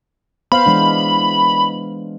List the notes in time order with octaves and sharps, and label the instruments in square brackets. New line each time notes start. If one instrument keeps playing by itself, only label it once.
[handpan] B3 C5 F5 [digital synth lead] B5
[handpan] E3 G#3 D4